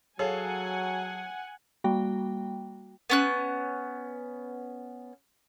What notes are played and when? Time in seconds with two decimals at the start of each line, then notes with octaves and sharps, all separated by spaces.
0.19 F#3 G#4 A4 C#5 F5 F#5 G#5
1.84 G3 A#3 F#4 G5
3.10 B3 C#4 F#6